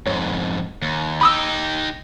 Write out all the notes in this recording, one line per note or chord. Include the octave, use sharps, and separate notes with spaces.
F2 G#2 C#5
D#2
D#4 G4 B5 D#6 E6